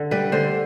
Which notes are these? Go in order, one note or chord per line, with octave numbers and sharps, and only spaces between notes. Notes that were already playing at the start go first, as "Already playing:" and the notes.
Already playing: D3
G3 B4
D3 C5